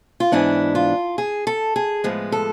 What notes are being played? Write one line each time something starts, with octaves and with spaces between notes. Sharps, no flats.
F4
G#2 E3 B3 D4 E4
F4
G#4
A4
G#4
A2 F3 G#3 B3
A4